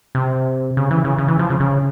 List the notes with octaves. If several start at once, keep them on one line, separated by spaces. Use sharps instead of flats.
C3
C#3
E3
C#3
C#3
E3
F3
C#3
C#3